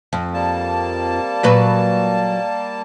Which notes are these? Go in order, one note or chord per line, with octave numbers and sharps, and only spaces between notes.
F2
G3 A#3 A5
A#2 F#3 B4